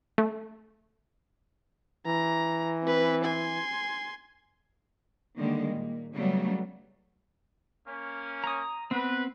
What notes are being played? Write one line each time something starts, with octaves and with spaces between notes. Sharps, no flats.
A3
E3 A#5
C4 B4
G#5 C6
D3 D#3 G3 G#3 A#3
A#2
C#3 F#3 G3 A3 B3
A#3 C#4
A#5 D#6
B3 C4 B4